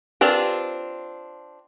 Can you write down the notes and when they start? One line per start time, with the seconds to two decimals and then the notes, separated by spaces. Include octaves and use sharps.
0.21 C4 D4 F4 G4 A#4 B4